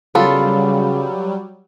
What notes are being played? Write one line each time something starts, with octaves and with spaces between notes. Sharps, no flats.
C#3 F#3 G3 B3 F4 A4 B5